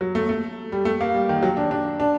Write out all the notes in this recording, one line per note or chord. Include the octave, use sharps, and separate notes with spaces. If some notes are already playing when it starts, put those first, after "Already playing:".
F#3
A3
A3
G3
A3
A#3
G3
D#3
F#3
D4
D4
D4